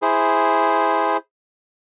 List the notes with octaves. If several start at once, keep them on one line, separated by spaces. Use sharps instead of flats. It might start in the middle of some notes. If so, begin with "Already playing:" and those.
E4 G#4 C5